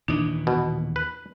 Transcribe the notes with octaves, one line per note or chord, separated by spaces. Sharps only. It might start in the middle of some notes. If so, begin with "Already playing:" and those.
D#2 A#2 E3 D4 D#4
B2
B4